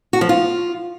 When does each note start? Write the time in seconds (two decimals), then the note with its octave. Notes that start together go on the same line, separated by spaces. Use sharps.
0.13 F#4
0.21 F3
0.29 F4